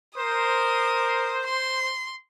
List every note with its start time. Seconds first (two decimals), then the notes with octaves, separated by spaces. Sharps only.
0.18 A#4 C5 D#6
1.45 C6